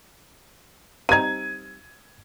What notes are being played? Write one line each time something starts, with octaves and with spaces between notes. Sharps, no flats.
G3 C4 D#4 G#6 D#7